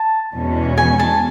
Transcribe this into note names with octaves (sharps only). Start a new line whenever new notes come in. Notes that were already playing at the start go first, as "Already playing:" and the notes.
Already playing: A5
E2 B2 G#3 C#4
G#5
A5